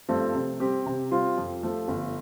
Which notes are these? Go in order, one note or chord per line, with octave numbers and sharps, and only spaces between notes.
G2 F3 A3 C4
C3
G3 C4 G4
C3
G3 C4 F4
F2
F3 A3
G1